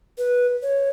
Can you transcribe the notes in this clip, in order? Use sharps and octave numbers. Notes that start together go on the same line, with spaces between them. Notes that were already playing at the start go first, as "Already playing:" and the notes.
B4
C#5